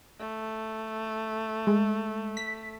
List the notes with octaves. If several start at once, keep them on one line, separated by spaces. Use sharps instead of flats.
A3
G#3
B6